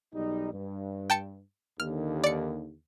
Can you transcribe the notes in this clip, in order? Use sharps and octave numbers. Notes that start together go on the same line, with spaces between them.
B1 G3 D#4
G2
G5 A5 C#7
D#2 D3 F6
D5 C#7